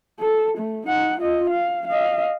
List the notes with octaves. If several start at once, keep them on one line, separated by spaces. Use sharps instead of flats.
A4
A3
D#4 F#5
F4 D#5
F5
D#5 F5